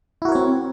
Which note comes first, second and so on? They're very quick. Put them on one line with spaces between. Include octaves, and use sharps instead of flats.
E4 F#4 A#4 C#5 C4